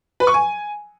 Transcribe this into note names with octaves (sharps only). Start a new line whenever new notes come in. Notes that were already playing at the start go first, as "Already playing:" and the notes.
B4
C#6
G#5